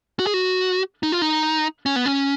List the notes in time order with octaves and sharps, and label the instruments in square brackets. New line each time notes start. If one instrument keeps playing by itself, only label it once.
[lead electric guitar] F#4
G#4
F#4
D#4
F4
D#4
C#4
B3
C#4